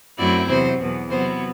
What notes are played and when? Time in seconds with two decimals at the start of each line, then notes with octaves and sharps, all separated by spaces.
0.18 F#2 F#3 A3 C4 E4 D5
0.48 E2 C3 F#3 C5
0.79 E2 B2 F#3
1.10 C3 F#3 B3 E4 C5